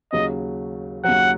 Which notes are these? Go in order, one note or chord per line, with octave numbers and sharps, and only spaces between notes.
D#2 C#3 F#3 D#5
D#2 C#3 F#3 F#5